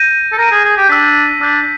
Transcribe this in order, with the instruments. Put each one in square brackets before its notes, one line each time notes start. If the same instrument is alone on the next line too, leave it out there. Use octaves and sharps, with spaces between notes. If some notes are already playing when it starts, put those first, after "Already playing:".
Already playing: [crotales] G6 A#6 D#7
[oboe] A4
[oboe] A#4 [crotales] G6 A#6 D#7
[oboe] G#4
G#4
G4
[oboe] D4 [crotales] E6 G6 B6
[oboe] D4 [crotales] E6 G6 B6